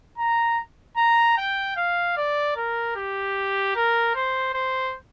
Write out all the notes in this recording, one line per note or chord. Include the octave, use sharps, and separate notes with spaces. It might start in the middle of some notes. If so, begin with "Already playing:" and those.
A#5
A#5
G5
F5
D5
A#4
G4
A#4
C5
C5